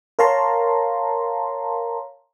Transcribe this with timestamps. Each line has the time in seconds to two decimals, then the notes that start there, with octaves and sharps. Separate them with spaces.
0.19 A#4 C#5 F5 A5 A#5 C6